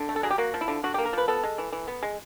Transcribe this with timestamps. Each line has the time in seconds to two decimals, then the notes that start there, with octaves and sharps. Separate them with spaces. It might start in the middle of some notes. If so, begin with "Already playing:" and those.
Already playing: D3
0.09 A3
0.16 A4
0.23 F#3 G#4
0.30 G4
0.38 A#3 F#4
0.54 F3
0.61 E4
0.68 D3
0.83 D3 F#4
0.94 G4
0.98 A#3
1.05 A#4
1.13 F3 B4
1.28 B3 A4
1.43 G#3
1.58 E3
1.72 E3
1.88 B3
2.03 G#3